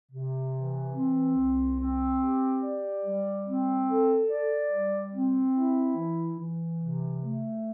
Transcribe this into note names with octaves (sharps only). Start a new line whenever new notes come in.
C3
E3
C4
C2
C4
G4
D5
G3
C4
A4
D5
G3
C4
E4
E3
E3
C3
A3